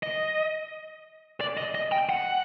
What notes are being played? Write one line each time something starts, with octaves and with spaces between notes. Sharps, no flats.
D#5
D5
D#5
D#5
G5
F#5